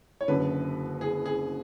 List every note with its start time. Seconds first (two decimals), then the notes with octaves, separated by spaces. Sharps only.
0.21 C#5
0.28 F#1 F#2 D3 B4
1.01 G#4
1.26 G#4